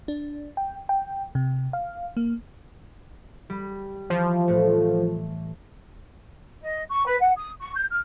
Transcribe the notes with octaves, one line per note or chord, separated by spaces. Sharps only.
D4
G5
G5
C3
F5
A#3
G3
E3 F3
A2 A3
D#5
C#6
B4
F#5
D#6
C#6
G6
F6